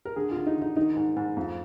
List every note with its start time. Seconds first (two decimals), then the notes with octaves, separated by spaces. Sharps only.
0.05 A#4
0.16 D3 G#4
0.31 D3 F4
0.47 D#4
0.56 D3
0.62 D#4
0.76 D#3 D#4
0.96 G#2
1.16 G#2
1.37 F2